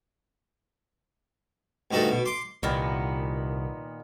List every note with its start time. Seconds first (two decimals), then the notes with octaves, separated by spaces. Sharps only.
1.91 D2 G2 D#4 F#4 A4
2.11 B2
2.25 C6 D6
2.63 C2 A#2 D#3 B3